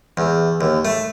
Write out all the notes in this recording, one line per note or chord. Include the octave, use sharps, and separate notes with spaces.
E2
D#2
A3